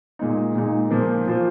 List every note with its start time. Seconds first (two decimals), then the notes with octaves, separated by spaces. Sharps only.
0.19 A#2 G#3 D#4
0.55 A#2 G#3 D#4
0.90 A#2 F3 A#3 F4 C5
1.26 A#2 F3 A#3 F4 C5